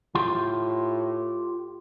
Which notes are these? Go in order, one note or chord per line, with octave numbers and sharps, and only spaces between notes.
A2 F4 G4 C6